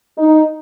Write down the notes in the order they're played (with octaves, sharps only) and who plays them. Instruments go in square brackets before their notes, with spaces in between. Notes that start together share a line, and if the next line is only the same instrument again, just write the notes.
[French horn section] D#4